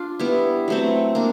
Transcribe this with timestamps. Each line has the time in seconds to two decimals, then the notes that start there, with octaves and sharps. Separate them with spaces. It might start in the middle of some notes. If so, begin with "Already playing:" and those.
Already playing: D4 F4
0.19 G3 B3 E4
0.68 F#3 A3 C4
1.15 A#3 D4